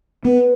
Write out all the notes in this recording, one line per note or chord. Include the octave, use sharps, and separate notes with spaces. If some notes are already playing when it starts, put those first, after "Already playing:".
B3 B4